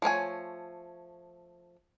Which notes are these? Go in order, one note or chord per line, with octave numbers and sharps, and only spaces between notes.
F3 A3 C#5 G#5